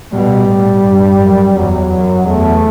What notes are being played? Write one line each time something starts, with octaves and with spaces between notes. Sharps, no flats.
B2 G3
A2
G2
F#2
E2 F#3
F#2
E2 A3